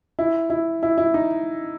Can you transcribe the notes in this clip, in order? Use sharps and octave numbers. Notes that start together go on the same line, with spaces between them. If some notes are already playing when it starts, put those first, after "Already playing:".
E4
E4
E4
E4
D#4